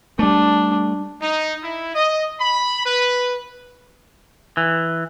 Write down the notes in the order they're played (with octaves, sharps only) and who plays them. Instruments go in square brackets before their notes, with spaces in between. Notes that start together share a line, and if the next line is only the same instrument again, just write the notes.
[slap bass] G3 A3 [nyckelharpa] D4
[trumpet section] D#4
E4
D#5
B5
B4
[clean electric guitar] E3